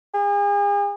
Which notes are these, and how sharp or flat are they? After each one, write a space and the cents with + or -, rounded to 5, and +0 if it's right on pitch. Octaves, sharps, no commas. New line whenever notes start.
G#4 -40